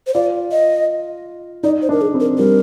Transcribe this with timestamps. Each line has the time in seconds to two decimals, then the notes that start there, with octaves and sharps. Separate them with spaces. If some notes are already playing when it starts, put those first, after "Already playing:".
0.07 C5
0.14 F4 D5
0.51 D#5
1.63 D#4 D5
1.82 C5
1.89 D4
1.92 A#4
2.01 G#4
2.14 C4
2.20 A#4
2.38 G3 A#4